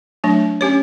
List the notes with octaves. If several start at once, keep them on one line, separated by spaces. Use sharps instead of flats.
F#3 A3 D4
C#4 G4 C#5